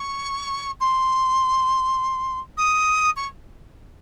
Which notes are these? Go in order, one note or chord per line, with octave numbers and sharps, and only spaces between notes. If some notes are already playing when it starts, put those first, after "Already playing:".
Already playing: C#6
C6
D#6
C#6